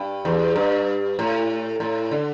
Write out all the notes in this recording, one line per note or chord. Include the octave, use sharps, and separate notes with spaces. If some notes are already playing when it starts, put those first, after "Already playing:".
Already playing: G2
E2
G2
A2
A2
D3